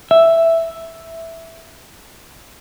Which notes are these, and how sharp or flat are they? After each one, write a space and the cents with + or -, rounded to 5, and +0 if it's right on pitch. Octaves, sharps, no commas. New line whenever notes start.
E5 +0